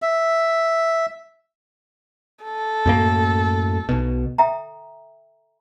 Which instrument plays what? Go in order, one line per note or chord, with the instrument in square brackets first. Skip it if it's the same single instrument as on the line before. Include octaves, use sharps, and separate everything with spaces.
[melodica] E5
[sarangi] A4
[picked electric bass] F#2 A2 A#3
B1 B2
[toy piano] A4 E5 G5 A#5